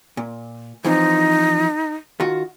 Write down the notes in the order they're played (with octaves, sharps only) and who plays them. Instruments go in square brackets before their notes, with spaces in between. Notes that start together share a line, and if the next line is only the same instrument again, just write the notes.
[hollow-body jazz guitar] A#2
[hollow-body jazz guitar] E3 F3 C4 [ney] D#4
[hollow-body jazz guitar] D#3 F4 F#4